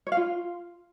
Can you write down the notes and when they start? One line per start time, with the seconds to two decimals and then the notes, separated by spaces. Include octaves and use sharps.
0.07 C#5
0.12 F5
0.17 F4